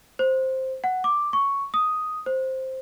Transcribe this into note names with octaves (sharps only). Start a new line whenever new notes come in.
C5
F#5
D6
C#6
D#6
C5